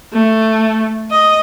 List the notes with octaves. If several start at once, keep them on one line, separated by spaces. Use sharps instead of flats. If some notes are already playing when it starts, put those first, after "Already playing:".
A3
D#5